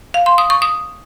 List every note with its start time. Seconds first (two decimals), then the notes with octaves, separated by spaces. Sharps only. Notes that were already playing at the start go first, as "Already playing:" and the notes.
0.14 F5
0.26 C6
0.38 D#6
0.50 C#6
0.62 D#6